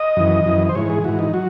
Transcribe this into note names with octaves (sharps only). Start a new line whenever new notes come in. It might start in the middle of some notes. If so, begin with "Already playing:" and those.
Already playing: D#5
F#2 E3
F#2 E3
C5
G#2 E3 C#5
G#4
G#2 E3 F#4
D#4
F#3 F#4